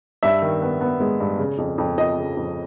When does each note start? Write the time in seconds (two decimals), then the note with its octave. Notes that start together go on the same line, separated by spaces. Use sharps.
0.23 G2 E5
0.42 D#3
0.62 B3
0.81 B3
1.00 G#3
1.20 G2
1.39 C#3
1.58 F2
1.78 F2
1.98 F3 D#5
2.18 C#3
2.37 F2